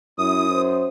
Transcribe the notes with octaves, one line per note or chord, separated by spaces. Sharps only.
F#2 E4 D#6
C5